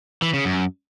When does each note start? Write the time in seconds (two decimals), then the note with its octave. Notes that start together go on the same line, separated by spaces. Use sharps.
0.22 E3
0.34 C#3
0.45 F#2